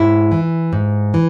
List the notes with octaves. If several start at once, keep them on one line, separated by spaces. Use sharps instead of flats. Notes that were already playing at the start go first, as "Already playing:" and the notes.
Already playing: G#2 E4
E3
G#2
E3